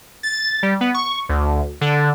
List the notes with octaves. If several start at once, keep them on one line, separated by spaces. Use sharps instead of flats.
A6
G3
B3
C#6
D2
D3